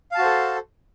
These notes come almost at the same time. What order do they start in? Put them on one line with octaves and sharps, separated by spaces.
F5 A5 F#4 C5 A4